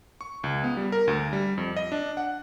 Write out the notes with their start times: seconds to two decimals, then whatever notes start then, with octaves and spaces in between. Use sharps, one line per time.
0.21 C#6
0.44 C#2
0.64 B3
0.77 G3
0.92 A#4
1.08 D2
1.33 G3
1.58 F2
1.77 D#5
1.92 D4
2.17 F#5